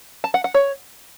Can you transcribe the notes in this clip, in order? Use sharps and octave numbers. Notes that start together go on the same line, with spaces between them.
A5
F#5
F#5
C#5